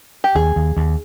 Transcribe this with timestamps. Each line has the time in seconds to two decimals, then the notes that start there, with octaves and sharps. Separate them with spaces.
0.24 G4
0.35 D#2 G#4
0.56 D#2
0.77 D#2